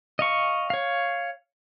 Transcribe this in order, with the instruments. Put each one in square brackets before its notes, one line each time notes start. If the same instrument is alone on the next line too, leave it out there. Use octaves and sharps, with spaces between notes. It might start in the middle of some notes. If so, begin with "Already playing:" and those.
[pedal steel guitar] D#5 F5 C#6
C#5 F5